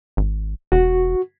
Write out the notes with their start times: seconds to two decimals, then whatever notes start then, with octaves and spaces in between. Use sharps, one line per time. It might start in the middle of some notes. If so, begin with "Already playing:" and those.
0.17 G#1
0.72 E1 F#4